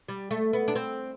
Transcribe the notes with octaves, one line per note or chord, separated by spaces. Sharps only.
G3
A3
B3
D4
C4